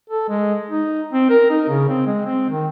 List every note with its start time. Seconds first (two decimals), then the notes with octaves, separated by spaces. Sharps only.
0.10 A4
0.29 G#3
0.70 D#4
1.13 C4
1.30 A#4
1.50 D#4
1.69 C#3
1.89 C4
2.07 G#3
2.26 C4
2.50 D#3